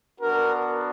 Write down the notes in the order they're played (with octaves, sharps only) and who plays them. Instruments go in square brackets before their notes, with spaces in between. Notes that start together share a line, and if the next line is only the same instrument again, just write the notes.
[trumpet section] B3 D4 F#4 A#4